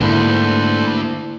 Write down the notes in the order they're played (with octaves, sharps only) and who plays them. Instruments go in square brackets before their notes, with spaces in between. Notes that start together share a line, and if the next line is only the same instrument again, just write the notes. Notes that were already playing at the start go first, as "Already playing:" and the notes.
[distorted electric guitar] D2 [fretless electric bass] G#2 D3 [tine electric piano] A#3 E4 [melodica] A4 B4 C5